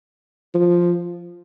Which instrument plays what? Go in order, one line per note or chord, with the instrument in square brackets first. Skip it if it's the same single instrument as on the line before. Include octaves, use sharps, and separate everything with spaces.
[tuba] F3